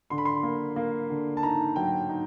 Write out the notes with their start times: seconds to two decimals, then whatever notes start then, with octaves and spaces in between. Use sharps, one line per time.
0.10 D3 C6
0.18 B5
0.25 C6
0.43 A#3
0.76 A#3
1.10 D3
1.37 A5
1.43 D#4 A#5
1.76 F#3 G5
2.09 D#4